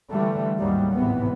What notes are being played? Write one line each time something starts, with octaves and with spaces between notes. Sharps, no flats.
D3 E3 G3 A3
A1 D#2 G#2 D#3 F#3 G3
G#1 A2 C3 E3 B3